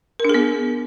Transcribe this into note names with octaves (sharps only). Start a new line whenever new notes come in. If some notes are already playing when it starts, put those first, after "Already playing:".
B3 D4 G#4 A#4